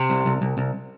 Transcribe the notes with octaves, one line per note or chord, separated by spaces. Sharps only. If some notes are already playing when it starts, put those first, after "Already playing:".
Already playing: C3
C2
C2
C2
C2